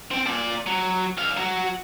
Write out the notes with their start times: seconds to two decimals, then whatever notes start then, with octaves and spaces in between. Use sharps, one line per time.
0.11 C4 G5
0.26 A#2 D5
0.66 F#3
1.18 D3 F5
1.37 F#3 F#4